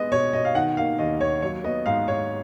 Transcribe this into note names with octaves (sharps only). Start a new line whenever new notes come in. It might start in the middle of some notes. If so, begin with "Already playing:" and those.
Already playing: G#3 B3 D#5
B2 C#5
B2 D#5
F5
D#3 F#5
A#3 F5
D#2 D#5
D#2 C#5
F#3 C#5
B3 D#5
G#2 F5
G#2 C#5